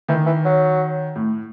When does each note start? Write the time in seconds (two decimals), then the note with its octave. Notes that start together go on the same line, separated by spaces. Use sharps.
0.08 D#3 E3
0.26 E3
0.45 F#3
1.16 A2